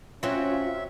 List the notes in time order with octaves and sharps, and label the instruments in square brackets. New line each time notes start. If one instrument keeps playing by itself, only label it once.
[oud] F#3 C4 [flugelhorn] C#4 [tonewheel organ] F4 [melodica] E5